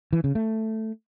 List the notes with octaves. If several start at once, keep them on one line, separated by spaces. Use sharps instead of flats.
E3
C#3
A3